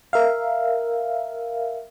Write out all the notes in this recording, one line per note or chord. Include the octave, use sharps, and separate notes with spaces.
A#4 E5 F5